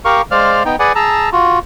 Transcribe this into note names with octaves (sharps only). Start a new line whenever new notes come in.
G4 A#4 F5 C#6
G#3 C5 D5 F5 F6
B3 D#4 G5
G#4 B4 D5 F#5 G#5
G#4 A5 A#5 E6
F4 F#4